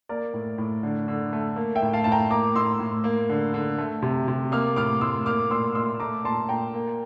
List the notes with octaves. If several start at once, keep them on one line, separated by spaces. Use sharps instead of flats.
A#3 A#4 D5
A2
A2
D3
D3
A3
A#3
E5 G5
A2
F5 A5
A2 A5
G5 A#5
A#3 A#5 D6
A2 C6 E6
A2
A#3
D3
D3
A3
C3
C3
A#3 D6 F6
A2 D6 F6
A2 C6 E6
A#3 D6 F6
A#2 C6 E6
A#2 C6 E6
A3 A#5 D6
A#2 A5 C6
A#2 G5 A#5
A#3